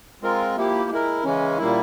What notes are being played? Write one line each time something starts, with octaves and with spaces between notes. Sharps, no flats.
G#3 C4 F4 A#4
F3 A#3 E4 G4
G#3 E4 A#4
C#3 E3 G#3 C#4
A#2 G3 A#3 E4